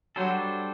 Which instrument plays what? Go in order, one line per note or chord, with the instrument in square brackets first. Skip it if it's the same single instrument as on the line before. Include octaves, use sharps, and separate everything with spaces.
[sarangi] F#3 [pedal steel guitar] G3 D4 A4 C5